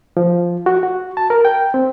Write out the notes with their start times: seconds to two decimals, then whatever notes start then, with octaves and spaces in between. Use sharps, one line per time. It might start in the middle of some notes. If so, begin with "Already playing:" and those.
0.17 F3
0.66 F#4
0.83 F#4
1.17 A5
1.30 A#4
1.45 G5
1.74 C4